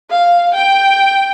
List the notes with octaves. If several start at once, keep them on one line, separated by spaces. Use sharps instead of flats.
F5
G5